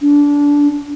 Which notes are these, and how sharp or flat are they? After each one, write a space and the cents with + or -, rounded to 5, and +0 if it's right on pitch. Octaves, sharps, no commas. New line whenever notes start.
D4 -20